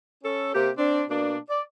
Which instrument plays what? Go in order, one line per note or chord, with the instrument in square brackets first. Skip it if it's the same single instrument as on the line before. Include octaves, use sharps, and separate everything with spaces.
[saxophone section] C#4 A4
C3 A#3 G4
C4 D4
B2 A#3 D4
D5